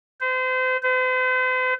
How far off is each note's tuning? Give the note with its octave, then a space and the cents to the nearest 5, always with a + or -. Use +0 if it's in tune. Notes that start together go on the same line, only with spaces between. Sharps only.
C5 -35
C5 -45